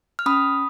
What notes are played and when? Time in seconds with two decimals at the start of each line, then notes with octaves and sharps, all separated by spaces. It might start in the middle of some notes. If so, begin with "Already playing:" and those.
0.19 F6
0.26 C#4 B5 D#6